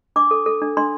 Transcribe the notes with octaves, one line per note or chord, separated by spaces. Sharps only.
D4 D6
A4
A4
D4
D4 C6